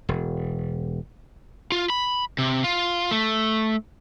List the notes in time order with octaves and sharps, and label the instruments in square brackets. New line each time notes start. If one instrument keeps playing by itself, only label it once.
[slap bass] E1
[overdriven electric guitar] F4
B5
C3
F4
A3